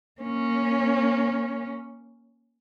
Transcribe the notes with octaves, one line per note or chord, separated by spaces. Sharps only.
A#3 C#4